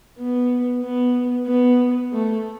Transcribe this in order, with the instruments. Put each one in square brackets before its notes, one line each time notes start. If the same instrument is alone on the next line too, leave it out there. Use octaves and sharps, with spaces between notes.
[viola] B3
B3
B3
A3